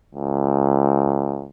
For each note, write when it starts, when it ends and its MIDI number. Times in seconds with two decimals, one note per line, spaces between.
0.15 1.48 37